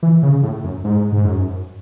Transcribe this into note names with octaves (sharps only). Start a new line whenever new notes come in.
E3
C#3
A2
F#2
G#2
G#2
F#2